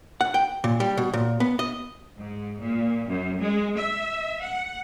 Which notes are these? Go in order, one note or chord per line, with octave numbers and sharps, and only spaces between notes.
F#5
G5
A#2
G3
B2
A#2
B3
D#5
G#2
A#2
F#2
G#3
E5
F#5